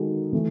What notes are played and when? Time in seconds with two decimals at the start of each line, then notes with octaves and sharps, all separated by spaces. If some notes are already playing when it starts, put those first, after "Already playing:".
Already playing: D#3 G#3 D#4 F#4 A4
0.33 E3 A3